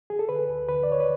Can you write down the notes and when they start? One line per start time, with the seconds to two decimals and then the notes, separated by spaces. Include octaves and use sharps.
0.10 G#4
0.19 A4
0.29 D3 B4
0.49 D2
0.68 D3 B4
0.83 D5
0.88 D3 C#5
1.00 B4